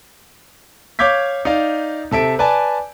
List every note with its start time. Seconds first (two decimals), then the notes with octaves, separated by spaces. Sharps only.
0.99 C#5 F5 D6 G6 G#6 B6
1.45 D#4 D5 F5
2.11 C3 A4 E5 D7
2.39 B4 D5 G#5 A5